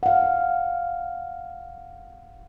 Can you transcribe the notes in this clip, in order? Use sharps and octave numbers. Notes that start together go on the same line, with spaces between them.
F5 F#5